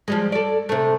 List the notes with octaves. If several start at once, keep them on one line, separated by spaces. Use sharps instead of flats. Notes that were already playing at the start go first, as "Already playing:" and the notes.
F3 G3 G#3
A4 D5
C3 A3